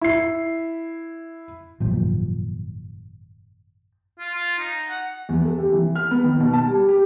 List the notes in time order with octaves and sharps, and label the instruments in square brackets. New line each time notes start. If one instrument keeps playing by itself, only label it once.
[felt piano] E4 C7
[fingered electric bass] G#1 F#2 A#2 F3
[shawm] F4
F4
D#4
F#5
[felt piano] E2
A4
C3
E3
F6
B3
D#3
B2
A5
G3
G4